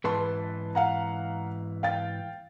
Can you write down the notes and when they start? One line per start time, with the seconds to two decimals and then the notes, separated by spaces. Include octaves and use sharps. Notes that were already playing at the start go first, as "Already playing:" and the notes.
0.04 G#2 E3 B4 A5 C6
0.75 F5 F#5 A#5
1.83 F5 G5 A6